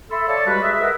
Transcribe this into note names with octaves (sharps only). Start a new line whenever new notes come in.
A4 E5 B5 C6 E6
A4 C#5 D5 F5 A5
G3 G#3 F#4 G4 B4
G#4 E5
G#4 A#4 B4 D#5 E5 F#5